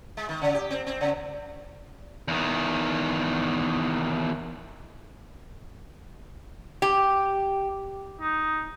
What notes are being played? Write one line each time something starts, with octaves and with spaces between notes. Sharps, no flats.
G#3
D#3
C#3
G4
C4
C4
C#3
E2 D#3
G4
D#4